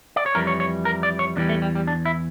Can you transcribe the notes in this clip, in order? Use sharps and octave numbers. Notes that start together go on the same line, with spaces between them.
D5
C#5
F2 E3 G3 A#4
C#5
C#5
A#4
D5
C#5
E2 E3 G3 D4
A3
G3
G3
D4
E4